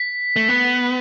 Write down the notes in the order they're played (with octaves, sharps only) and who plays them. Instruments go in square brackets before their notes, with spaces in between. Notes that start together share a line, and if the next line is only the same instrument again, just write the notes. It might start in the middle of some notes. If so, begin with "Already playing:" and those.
Already playing: [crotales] B6
[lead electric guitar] A3
B3